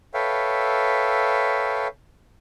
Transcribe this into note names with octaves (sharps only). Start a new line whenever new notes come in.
A4 B4 C#5 E5 F5 G5